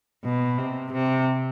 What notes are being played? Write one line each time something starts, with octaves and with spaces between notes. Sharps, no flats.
B2
C3
C3